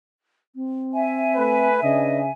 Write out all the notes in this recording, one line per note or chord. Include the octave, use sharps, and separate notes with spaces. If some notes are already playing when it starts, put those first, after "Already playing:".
C4
E5 G#5
A3 B4
C#3 D4 B4 D#5